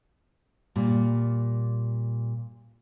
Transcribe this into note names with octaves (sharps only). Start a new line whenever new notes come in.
A#2 G3